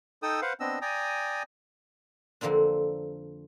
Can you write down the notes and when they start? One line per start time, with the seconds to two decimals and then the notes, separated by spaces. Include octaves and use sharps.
0.23 D#4 A4 G5 D#6 E6
0.42 B4 C5 F5 F#5
0.60 B3 C4 D4 D#5 E6
0.82 D5 G5 G#5 A#5 D#6
2.41 F2 D3 A#3 C4 D4